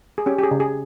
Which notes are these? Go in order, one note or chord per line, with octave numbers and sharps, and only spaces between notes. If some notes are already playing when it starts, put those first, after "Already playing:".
G#4
C#4 G4
G4
G#4
C#3
G#4